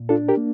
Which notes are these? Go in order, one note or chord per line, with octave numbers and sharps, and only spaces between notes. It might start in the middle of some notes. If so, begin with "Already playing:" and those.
Already playing: A#2
D4 F4 A4
G4 A#4
A#3